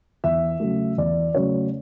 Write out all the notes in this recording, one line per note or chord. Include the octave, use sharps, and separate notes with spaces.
E2 E5
C#3 F#3 A3
E2 D5
C#3 F#3 A3 C#5